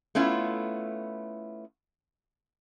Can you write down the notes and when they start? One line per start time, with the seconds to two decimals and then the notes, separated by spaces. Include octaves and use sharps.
0.15 A3 B3 C#4 E4 F4